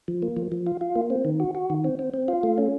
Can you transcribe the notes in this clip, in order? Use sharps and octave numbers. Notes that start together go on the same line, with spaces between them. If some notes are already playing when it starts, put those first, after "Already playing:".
F3
A#3
F3
F3
F4
F4
A#3
C4
D#3
F#4
F#4
D#3
C4
C4
C4
F4
A3
C#4